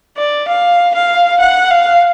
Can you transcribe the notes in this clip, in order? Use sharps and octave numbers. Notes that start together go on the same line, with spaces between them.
D5
F5
F5
F#5
F5